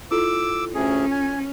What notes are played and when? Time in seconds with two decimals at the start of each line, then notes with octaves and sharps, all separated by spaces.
0.11 E4 F4 A4 D6 E6
0.75 D2 C#4 G#4
1.11 G#5